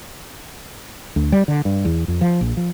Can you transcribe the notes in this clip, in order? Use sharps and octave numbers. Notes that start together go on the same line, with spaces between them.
D2
G3
D3
G2
E2
F2
F3
A#1
F3